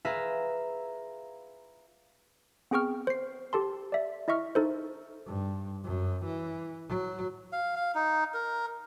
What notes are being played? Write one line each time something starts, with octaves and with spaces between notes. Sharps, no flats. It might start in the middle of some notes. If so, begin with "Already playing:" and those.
F4 G#4 B4 E5 F5 A#5
B3 C4 G#4 G5 C#6 F6
C5 C7
G4 A4 A5 C6
D5 E5
E4 D#5 E5 C#6 F6
D#4 A4 C5
G2
F#2
E3
F#3
F5
F5
D#4
A#4